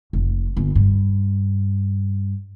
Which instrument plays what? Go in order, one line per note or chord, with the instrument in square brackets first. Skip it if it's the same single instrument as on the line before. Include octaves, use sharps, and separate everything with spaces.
[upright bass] F1
G1
G2